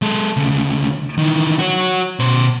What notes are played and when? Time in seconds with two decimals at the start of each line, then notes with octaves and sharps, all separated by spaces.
0.02 G#3 A4
0.37 D2 C#3
1.18 D#3 E3
1.59 F#4 C#5
2.19 B2 C5